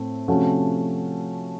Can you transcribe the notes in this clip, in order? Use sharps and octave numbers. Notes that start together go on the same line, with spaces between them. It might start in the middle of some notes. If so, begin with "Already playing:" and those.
Already playing: A2 A3 C4
C3 F3 A3 C#4 F#4